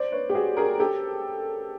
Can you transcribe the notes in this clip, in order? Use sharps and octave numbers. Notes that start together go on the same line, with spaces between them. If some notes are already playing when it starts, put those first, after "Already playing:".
Already playing: C5 D5
B4 C#5
G4
F#4 G#4
G#4 A#4
G4 A4